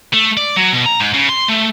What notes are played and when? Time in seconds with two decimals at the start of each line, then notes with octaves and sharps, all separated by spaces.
0.14 A3
0.37 D5
0.56 F#3
0.73 B2
0.86 A#5
1.00 G#2
1.14 C#3
1.29 C6
1.48 A3